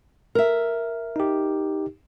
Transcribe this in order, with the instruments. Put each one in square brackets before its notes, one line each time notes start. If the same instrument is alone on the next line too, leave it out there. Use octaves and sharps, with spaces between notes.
[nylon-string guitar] A#4 E5
[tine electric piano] D#4 G4